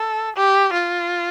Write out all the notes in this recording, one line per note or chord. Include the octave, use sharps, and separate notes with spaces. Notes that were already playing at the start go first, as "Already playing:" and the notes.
Already playing: A4
G4
F4